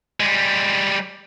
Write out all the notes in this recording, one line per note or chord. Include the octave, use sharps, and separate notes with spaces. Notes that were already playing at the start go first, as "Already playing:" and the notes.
G3 G#3